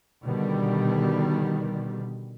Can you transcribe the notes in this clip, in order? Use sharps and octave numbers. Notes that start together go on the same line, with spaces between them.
B2 D3 D#3 G3